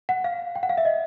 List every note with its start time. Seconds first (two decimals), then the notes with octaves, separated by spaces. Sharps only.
0.09 F#5
0.24 F5
0.56 G5
0.63 F#5
0.69 F5
0.78 E5
0.85 D#5